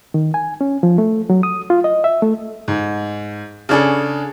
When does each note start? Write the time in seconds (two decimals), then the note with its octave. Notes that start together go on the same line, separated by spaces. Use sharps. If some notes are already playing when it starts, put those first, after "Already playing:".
0.14 D#3
0.34 G#5
0.61 C#4
0.83 F3
0.98 A3
1.30 F#3
1.43 D#6
1.70 F4
1.84 D#5
2.04 E5
2.22 A3
2.68 G#2
3.69 C#3 C#4 D4 G#4 A4